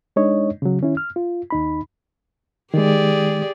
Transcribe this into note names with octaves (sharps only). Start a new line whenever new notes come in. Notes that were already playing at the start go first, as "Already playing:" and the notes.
G#3 D4 D#4 C#5 D#5
C#3 F#3
D#3 C#4 E4
F6
F4
D#2 D#4 B5
D#3 G#3 G4 G#4 D5